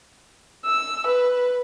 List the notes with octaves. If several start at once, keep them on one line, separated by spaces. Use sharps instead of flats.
E6
B4